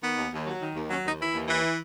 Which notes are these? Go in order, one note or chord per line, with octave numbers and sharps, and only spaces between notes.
D#3 B3
D#2
D#2
F#3
D#3
D#2
F#3 C#4
D#2 D#4
E3 E4
D#2
E3